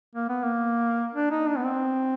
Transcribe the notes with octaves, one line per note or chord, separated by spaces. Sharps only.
A#3
B3
A#3
D4
D#4
D4
B3
C4